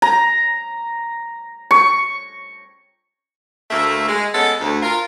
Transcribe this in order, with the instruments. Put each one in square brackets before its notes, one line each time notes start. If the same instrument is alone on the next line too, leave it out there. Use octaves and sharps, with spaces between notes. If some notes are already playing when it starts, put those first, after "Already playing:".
[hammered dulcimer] A#5
C#6
[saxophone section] D2 A3 A#3 E5
G#3
G#3 B3 C#4 A4
D2
F4 A#4